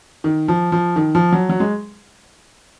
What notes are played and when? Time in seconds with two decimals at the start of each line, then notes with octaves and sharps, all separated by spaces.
0.24 D#3
0.48 F3
0.72 F3
0.96 D#3
1.15 F3
1.32 F#3
1.49 F#3
1.60 G#3